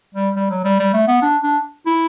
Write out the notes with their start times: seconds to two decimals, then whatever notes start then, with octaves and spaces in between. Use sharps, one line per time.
0.15 G3
0.36 G3
0.50 F#3
0.65 G3
0.79 G3
0.94 A3
1.08 B3
1.22 D4
1.43 D4
1.86 E4